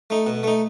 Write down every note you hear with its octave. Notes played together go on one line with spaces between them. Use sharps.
A3 D#4
B2
A3 D#4